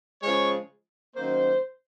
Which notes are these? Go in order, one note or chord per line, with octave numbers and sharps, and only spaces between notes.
C#3 F3 G#3 C#5
F#2 D#3 A#3 C5